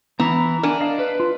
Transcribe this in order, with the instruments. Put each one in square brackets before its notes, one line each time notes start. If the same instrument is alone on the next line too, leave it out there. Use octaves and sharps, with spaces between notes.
[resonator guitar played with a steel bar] E3 [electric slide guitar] B3 [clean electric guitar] A#5
[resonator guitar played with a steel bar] D4 [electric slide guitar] A#4 F#5 G#5
[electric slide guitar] D#5 F5 A5
[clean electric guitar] B4
[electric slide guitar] F4